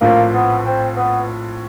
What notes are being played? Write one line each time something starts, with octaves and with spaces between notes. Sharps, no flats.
A#1 A2 F3 A3 A#3 C4
B3
C4
B3